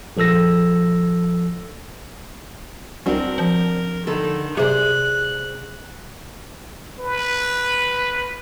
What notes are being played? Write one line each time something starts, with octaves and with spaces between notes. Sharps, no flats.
A#1 F3 A4 E6 A#6
C2 C4 D4 F#4 A#4
F3
D3 D#3 A4
C3 G#4 C5 D5 F#6
B4